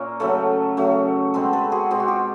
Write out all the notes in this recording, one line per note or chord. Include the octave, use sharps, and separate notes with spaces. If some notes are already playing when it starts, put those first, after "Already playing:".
Already playing: A#2 A#3 C#4 A#4 E5
C#3 F#3 A3 A4 B4
C#3 F#3 A3
B2 G#3 C4 A4 B4
A4 B4
F#4 G#4
B2 G#3 C4 G4
F#4
F4 G4